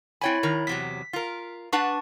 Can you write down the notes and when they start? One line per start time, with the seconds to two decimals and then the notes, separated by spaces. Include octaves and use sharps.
0.21 C4 E4 C#5 G5 G#5 B5
0.43 D#3 A#4
0.67 E2 C3 F#3 B6
1.13 F4 A#4
1.73 D4 B4 F#5 A5 C#6